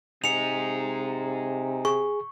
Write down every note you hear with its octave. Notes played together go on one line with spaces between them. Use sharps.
C3 D#4 G#4 C#7 F7
G#4 C#6